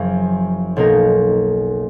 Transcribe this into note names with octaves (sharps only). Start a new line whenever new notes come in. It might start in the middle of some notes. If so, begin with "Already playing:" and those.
Already playing: F#1 F#2 F3
B1 B2 A#3 D#4 A#4